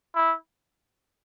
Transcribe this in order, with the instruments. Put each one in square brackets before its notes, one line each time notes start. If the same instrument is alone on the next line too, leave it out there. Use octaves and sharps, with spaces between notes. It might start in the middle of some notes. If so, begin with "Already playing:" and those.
[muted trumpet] E4